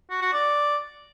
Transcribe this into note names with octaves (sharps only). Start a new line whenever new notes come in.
F#4
F#4
D5